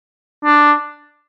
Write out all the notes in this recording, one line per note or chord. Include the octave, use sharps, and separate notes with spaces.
D4